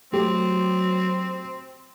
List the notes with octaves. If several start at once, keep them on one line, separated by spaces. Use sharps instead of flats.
F#3 A3 C4 G4